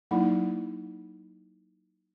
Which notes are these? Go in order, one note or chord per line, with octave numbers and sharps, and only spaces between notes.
F#3 A#3 D#4 E4